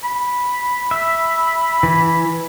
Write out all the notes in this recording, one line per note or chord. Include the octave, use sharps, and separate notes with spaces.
B5
E5
E3